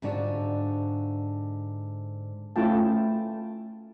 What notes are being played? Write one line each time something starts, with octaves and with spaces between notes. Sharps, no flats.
G#2 D3 D4 F4 F#4
A3 C#4 E4 F4 G5 A5